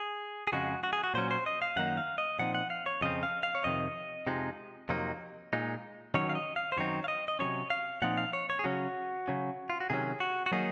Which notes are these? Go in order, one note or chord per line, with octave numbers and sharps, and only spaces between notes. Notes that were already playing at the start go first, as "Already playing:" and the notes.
Already playing: G#4
G#4
F2 C#3 G#3 F#4
F#4
G#4
F#4
A#2 F#3 C#4 C5
C5
D#5
F5
F#2 D#3 A#3 D#4 F#5
F5
D#5
A#2 F3 C4 D#4 F#5
F#5
F5
C#5
F2 C#3 F3 C4 D#5
F5
F5
C#5
F2 C3 D#3 D#5
F2 C3 F3 G#3 D#4
F2 C3 F#3 A#3 D#4
A#2 G#3 D#4
D#3 F#3 C#4 C#5
F5
D#5
F5
C5
F#2 D#3 F#3 C4 D#4 C#5
F5
D#5
D#5
C3 D#3 F#3 C#4 C#5
F5
A#2 F3 C4 D#4 F#5
F5
C#5
C#5
G#4
C#3 F#3 C#4 F#4
C#3 F#3 C#4
F4
F#4
C3 D#3 F#3 C#4 G#4
F#4
F#4
D#3 F#3 A#3 D#4 G#4